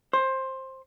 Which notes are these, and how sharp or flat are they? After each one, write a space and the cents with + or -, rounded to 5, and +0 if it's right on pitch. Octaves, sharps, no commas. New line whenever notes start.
C5 +15